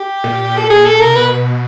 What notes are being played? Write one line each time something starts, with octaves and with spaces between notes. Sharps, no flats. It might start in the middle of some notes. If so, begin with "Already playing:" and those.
Already playing: G4
A#2
A4
G#4
A4
A#4
C3
B2 B4